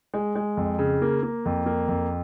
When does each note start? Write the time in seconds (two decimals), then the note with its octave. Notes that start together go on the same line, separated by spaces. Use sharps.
0.14 G#3
0.35 G#3
0.57 F2
0.79 C#3
1.02 A#3
1.23 A#3
1.45 F2
1.66 A#3
1.88 F2